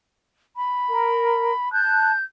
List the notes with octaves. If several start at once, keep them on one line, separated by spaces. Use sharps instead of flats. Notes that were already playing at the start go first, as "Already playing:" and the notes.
B5
A#4
A5 F#6 G6